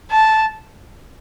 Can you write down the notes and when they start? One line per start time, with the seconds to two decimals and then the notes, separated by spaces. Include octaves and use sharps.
0.11 A5